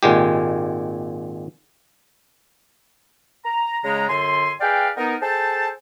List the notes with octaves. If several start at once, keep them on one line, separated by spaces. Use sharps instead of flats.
G#1 A#2 G#3 G4
A#5
C#3 G#3 A#5
F#2 D3 G#5 C6
G#4 B4 D5 F5 G5
B3 D#4 A#4
G#4 A4 C5 G5 A5